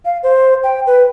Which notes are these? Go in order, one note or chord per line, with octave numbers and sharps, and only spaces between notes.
F5
C5
G5
B4